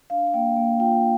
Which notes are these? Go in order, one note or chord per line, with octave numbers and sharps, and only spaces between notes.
D4 F5
F5
A#3 G5
A#3
F4 G5